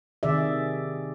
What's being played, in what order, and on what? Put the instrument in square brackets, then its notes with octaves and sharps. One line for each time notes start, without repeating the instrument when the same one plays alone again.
[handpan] C3 D#3 G#4 D5 E5